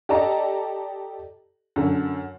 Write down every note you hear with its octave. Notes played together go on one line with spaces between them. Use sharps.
G4 A4 D5 D#5 A5 A#5
F#2 D3